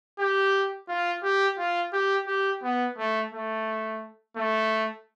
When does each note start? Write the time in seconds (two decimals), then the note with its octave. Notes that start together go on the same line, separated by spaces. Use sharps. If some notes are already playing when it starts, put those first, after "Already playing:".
0.19 G4
0.88 F4
1.23 G4
1.58 F4
1.93 G4
2.27 G4
2.63 B3
2.98 A3
3.32 A3
4.36 A3